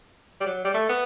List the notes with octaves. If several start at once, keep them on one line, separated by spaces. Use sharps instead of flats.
G3
F#3
G3
A3
B3